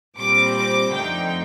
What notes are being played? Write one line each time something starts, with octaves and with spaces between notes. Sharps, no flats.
A#2 G3 C4 D6
D6
F2 D3 A3 D#4 G5